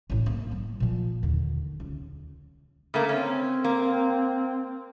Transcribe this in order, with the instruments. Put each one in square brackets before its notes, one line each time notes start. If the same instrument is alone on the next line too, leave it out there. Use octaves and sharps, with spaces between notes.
[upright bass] A1 A2
A#3
G3
A#2 F3
D#2 D3
C#2
[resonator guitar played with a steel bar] C#3 A3 A#3
[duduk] C4 [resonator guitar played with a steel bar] C#4
[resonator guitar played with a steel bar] A#3